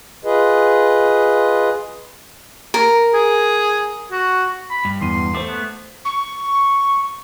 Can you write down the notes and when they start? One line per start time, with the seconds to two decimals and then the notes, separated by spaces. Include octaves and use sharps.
0.25 F4 G#4 B4 D#5
2.74 A#4
3.14 G#4
4.12 F#4
4.70 B5
4.85 G2
5.01 E2 C6 D#7
5.35 A3 C5 D6
5.48 B3
6.05 C#6